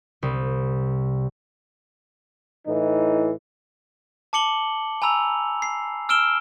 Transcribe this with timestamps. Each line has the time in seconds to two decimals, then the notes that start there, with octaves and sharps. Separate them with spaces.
0.23 C2
2.67 A2 E3 D#4
4.33 A5 D6 C#7 F#7 G7
5.02 G#5 A#5 B5 E6 F7
5.62 C7
6.09 E6 F6 D7 E7 G7